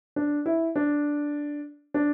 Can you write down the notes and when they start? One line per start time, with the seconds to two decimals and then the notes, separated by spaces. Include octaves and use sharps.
0.16 D4
0.46 E4
0.76 D4
1.94 D4